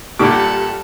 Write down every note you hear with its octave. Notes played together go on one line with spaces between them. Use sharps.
G2 A#2 G3 A4 F#5 D6